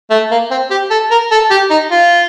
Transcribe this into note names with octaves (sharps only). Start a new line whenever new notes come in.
A3
A#3
C4
G4
A4
A#4
A4
G4
D#4
F4